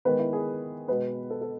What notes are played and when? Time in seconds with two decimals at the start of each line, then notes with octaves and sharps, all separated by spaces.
0.05 D#3 G#3 B3 B4
0.19 E4
0.33 G#4
0.88 B2 G#3 B3 B4
1.30 A4
1.41 A4